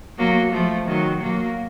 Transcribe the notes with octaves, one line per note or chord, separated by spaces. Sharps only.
F#3 A#3
F3 A3
D#3 F#3
F#3 A#3